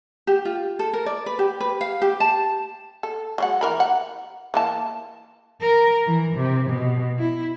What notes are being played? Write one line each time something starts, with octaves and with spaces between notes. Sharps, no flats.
G4
F4
A4
A#4
D5
B4
G4
B4
F5
G4
A5
A4
F#3 G#3 F#5
E3 A#4 B5
F#5
E3 A#3 A5
A#4
E3
C3
B2
E4